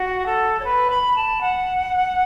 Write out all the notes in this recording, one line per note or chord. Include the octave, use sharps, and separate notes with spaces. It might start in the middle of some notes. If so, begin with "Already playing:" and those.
Already playing: F#4
A4
C#5
B4
B5
A5
F#5